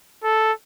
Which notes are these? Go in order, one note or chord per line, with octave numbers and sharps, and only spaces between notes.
A4